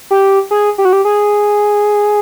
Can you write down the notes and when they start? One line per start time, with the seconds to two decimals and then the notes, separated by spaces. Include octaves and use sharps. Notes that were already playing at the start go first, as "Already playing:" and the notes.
0.11 G4
0.51 G#4
0.78 G4
0.85 F#4
0.93 G4
1.05 G#4